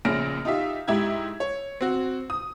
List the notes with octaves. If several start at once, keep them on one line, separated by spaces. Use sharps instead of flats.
A#1 A#2 C#3 F6 A#6 D7
D#4 F4 G4 E5
G#2 E4 G4 E6 G#6
C#5
C4 F#4
D#6